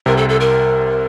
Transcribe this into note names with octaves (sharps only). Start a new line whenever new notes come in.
C2 C3 A#4
A4
A4
A#4